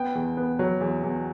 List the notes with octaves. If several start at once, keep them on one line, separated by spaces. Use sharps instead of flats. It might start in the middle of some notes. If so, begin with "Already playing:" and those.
Already playing: B3 G5
E2
B3
F#3
E2
E2